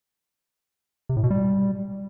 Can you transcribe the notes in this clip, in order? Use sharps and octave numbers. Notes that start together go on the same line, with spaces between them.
C3
A2
B2
G3